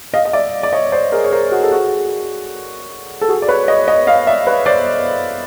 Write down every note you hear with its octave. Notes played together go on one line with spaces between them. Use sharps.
D#5 F5
D#5
D5 E5
D5
C#5 D#5
C5 D5
G#4 A#4
C#5
A#4 C5
F#4 G#4
A4
F#4 G#4
A4
F#4 G#4
D5
B4 C#5
C#5 D#5
C#5 D#5
D#5 F5
D5 E5
B4 C#5
C5 D5